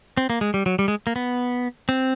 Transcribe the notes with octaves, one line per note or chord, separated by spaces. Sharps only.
C4
A#3
G#3
G3
F#3
G3
G#3
A#3
B3
C4